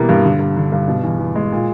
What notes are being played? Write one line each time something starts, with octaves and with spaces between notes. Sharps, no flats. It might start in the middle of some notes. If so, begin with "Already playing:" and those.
Already playing: B2 E3 G3 A#3
G2
D3
G2
D3
G2
B2
E2
E2
G#3
A#2